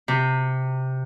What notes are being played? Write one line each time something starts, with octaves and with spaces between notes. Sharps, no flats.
C3